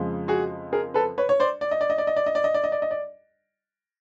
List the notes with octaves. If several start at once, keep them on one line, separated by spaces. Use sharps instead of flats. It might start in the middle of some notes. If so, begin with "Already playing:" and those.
Already playing: F2 C#3 F3 G#3
F#4 G#4
G#4 A#4
A4 B4
B4 C#5
C#5
C5 D5
D5
D#5
D5
D#5
D5
D#5
D5
D#5
D5
D#5
D5
D#5
D5
D#5
D5